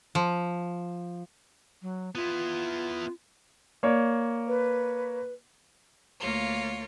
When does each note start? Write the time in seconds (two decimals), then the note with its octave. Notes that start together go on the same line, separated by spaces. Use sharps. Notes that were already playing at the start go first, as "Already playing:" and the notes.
0.15 F3
1.82 F#3
2.15 B3 E4 F4
3.83 A#3 C#5 D5
4.47 B4
6.20 D2 A#3 F4 C#5